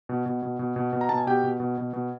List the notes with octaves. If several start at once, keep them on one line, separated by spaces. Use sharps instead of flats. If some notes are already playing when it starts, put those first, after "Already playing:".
B2
B2
B2
B2
B2
B2
A#5
B2 A5
G#5
B2 G4 G5
B2
B2
B2
B2